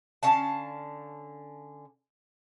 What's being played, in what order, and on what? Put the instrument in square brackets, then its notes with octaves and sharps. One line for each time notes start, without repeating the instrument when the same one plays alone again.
[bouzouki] D3 C#4 F5 A5